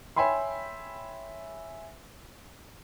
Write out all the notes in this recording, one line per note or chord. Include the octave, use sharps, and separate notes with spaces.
C#5 E5 G5 G#5 B5 C6